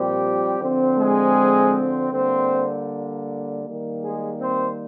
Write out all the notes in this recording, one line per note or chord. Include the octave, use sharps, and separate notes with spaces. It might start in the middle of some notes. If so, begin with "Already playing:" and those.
Already playing: A#2 F3 G3 C4 G4
D3 F3 C4
G#3 G#4
D3 G3 A#3 C4 C5
D#3 G3 A#3
G#3 G#4
C4 C5